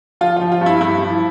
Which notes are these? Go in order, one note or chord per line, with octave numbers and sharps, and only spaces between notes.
F3 F4
F3 F4
F4
G2 E4
G2 E4
F3